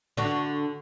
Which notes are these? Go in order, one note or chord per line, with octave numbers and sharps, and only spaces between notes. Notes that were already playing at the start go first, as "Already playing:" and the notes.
D3 D4 F#4